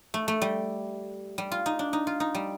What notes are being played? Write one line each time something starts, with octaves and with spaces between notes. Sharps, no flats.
A3
A3
G3
G3
F4
D#4
D4
D#4
F4
D#4
G3